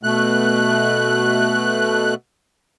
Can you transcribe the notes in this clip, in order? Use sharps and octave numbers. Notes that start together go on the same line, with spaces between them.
B2 A3 F#6